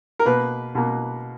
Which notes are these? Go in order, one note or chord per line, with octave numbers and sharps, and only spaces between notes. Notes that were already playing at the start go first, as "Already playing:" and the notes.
A#4
B2 A#3 B4
B2 A#3